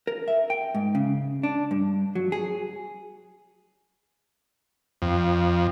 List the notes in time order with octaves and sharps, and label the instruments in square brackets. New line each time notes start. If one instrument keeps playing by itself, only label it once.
[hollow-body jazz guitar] A#4
E5
G5
G#2
C#3
D4
G2
F#3
G#4
[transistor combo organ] F2